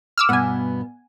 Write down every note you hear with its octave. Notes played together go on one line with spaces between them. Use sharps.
D6 E6 F6
G2 B2 B3 F#5 G#5